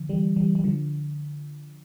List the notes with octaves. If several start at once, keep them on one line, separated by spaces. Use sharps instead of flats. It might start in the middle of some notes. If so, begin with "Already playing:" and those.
Already playing: D3 F3
E3 G3
E3 G3
G3
D3 F3